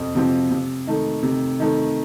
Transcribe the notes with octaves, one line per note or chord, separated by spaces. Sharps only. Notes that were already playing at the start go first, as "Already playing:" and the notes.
Already playing: F2 C3 C4
C3 F3 C4
C3
D#3 A3
C3
D#3 A3